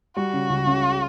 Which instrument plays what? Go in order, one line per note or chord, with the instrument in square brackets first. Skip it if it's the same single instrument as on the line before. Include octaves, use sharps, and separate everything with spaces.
[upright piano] G3 [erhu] F#4
[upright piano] C#3
C#2
C#3